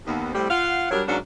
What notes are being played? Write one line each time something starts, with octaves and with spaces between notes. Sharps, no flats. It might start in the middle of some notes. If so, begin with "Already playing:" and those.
D#2 B3
A2 G3 C4
F4 F5 F#5
F#3 G3 D4 G4 A#4 C#5
G#2 F#3 A#3 C#4 D4